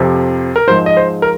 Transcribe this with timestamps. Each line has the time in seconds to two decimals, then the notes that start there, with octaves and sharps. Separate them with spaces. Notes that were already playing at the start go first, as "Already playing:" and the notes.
Already playing: F2 C3 F3
0.56 A#4
0.67 G#2 F3 G#3 C5
0.86 D#5
0.97 C5
1.22 A#4